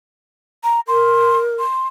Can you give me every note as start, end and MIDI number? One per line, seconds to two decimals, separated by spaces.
0.64 0.80 82
0.88 1.58 70
0.88 1.38 84
1.59 1.88 84